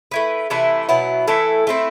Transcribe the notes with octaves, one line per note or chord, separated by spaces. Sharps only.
A3 E4 B4
C3 E3 A3 E4
B2 F#3 B3 E4
E3 A3 E4 A4
A3 C4 E4